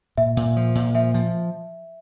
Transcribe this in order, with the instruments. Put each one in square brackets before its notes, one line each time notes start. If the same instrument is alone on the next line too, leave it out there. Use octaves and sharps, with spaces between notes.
[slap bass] A#2 [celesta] E5
[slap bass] A#2
F3
A#2
[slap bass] F3 [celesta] E5
[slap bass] F3